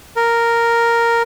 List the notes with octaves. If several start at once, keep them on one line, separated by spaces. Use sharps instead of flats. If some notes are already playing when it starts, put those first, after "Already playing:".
A#4